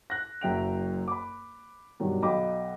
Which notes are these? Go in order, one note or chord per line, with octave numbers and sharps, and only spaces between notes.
F#6 A#6
F#1 F#2 E5 G5 D7 F7
B5 D6
G2 B2 D#3 F#3
B1 D#5 F5 G5 B5 D6